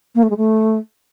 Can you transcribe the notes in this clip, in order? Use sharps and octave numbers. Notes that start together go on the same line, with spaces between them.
A#3
A3
G#3
A3